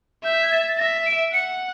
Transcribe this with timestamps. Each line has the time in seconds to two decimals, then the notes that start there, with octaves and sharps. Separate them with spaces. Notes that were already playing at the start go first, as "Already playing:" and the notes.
0.24 E5 G6
0.43 G#6
0.52 A6
0.68 A6
0.79 E5 A#6
1.06 D7
1.33 F#5 C#7